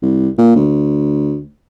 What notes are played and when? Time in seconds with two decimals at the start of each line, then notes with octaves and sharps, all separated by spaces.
0.02 C2
0.38 A#2
0.56 D2